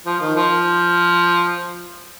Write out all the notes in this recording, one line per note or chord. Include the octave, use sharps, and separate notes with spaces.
F3
D#3
F3